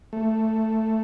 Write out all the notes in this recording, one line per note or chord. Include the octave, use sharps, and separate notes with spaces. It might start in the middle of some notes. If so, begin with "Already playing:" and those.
A3